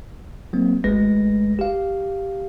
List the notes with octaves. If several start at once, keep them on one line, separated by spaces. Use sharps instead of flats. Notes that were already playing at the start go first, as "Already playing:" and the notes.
F#3 A#3 C4
G#1 G#3 A3 B4 A#6
G4 F5